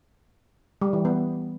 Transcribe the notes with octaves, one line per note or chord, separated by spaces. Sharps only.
G3
E3
B3